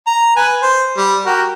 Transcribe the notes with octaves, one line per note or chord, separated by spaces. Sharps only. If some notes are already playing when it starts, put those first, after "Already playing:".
A#5
B4 G#5
C5
G3
F#4 G4 A#4